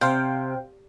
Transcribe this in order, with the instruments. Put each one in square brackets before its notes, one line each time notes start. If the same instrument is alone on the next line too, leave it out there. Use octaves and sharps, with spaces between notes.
[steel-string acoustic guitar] C3 [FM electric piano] C5 F5 G5